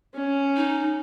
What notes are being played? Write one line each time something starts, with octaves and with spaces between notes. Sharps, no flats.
C#4
D#4